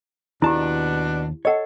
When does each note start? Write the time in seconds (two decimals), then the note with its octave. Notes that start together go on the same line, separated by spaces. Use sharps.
0.42 D#2 B2 D4 E4 G4 A5
1.45 A4 C#5 D#5 F#5